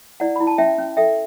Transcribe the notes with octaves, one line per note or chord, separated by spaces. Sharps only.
E4 D5 F#5
E4 B5
A5
C#4 E5 G5
C#4
A4 E5 G5